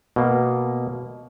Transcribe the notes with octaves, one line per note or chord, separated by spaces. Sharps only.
B2 A#3